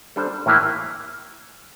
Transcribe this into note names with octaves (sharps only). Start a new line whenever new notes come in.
G3 D4 A4 C5
A2 E3 A#3 E4